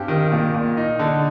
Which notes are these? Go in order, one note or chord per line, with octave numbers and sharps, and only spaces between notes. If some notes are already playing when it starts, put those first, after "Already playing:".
Already playing: G2 C4 G4
D#3
A#2
A#2
D#4
D3